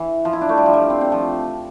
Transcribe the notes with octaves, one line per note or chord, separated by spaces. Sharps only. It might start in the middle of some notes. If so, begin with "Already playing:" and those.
Already playing: E3
F3
E4
D4
A3
G3
F3
G3
C4
C4
F3